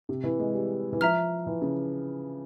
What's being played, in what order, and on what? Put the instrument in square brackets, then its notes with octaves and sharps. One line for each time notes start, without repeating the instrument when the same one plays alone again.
[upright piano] C3
E3
G#3
G3
E3
[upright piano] F3 [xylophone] E5 A#5 F6
[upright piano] E3
C#3